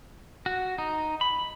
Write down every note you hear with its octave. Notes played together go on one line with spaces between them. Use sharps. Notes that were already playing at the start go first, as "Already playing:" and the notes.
F#4
D#4
B5